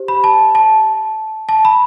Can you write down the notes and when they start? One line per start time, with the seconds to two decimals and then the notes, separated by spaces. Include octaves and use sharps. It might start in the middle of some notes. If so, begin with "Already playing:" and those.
Already playing: G4 C5
0.08 B5
0.24 A5
0.55 A5
1.49 A5
1.65 B5